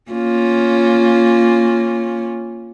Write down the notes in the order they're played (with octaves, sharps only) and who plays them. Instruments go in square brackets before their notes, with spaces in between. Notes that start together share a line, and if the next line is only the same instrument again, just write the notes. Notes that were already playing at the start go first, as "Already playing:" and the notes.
[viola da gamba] A#3 C#4 F4